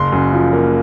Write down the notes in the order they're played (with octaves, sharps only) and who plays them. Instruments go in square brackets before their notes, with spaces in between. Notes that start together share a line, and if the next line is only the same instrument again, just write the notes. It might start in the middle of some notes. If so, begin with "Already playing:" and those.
Already playing: [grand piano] F#1 C6
F#2
F3
A#3